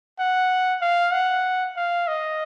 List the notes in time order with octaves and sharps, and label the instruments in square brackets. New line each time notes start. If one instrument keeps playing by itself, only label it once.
[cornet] F#5
F5
F#5
F5
D#5